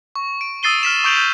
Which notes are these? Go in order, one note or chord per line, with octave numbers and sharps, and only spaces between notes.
C#6
D7
D#6 E6 A6 C7 D#7 G7
F6 B6 E7
C#6 D#6 G6 D7 F7 F#7
G6 C7